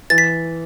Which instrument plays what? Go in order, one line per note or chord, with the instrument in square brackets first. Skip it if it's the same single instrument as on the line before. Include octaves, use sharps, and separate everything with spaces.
[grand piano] E3 [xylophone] A6
[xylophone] B6